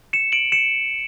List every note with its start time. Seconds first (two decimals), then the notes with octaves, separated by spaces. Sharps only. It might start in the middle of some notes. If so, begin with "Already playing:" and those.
0.13 C#7 E7
0.32 D7 F#7
0.52 C#7 E7